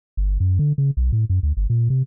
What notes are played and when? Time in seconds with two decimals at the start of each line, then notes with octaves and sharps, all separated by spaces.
0.17 G1
0.40 F#2
0.59 D3
0.78 C#3
0.97 B1
1.12 A2
1.30 F#2
1.43 D2
1.57 G1
1.70 A#2
1.90 C3